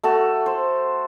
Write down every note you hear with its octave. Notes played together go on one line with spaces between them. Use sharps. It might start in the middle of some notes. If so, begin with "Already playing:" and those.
A3 F#4 A4
C5